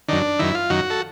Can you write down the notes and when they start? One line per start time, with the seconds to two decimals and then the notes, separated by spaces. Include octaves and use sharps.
0.08 F#2 D#3 D4
0.39 F#2 D#3 E4
0.55 F4
0.70 F#2 D#3 F#4
0.90 A4